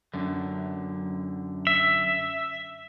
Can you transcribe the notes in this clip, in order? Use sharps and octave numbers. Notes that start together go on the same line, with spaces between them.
F#2 D3
E5